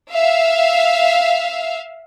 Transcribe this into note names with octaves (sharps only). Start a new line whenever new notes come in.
E5 F5